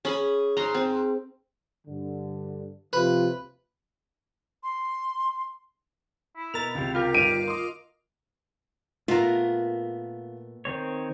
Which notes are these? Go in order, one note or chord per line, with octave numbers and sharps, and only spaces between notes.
C#4 G#4 B5
G#2 A#5 C6
C4
G2 D3
C3 F3 F4 B4
C6
E4
B2 A#4 A#5 A6 F7
C#2 C3 E4
F4 G4 A#4
G1 D#3 D7 D#7 F7
D#5 C6 D6
A#2 A3 B3 F4 A#4
D#3 C4 C#5